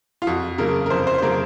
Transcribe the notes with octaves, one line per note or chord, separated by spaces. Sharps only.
F4
F2 F#4
C#3 F#3 A#3 A#4
A#4
F2 C5
C5
C5
C#3 F#3 A#3 A#4